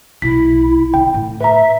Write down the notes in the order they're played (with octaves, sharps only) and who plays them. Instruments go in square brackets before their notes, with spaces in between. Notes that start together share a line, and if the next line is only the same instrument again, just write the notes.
[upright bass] B1 A#2 [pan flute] E4 [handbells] B6
[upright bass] D3 [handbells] G5
[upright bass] A2
[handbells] B4 A#5 [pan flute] E5